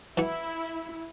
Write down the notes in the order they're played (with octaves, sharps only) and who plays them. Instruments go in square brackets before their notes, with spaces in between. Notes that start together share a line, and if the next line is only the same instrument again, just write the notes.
[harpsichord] E3 F#4 [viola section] E4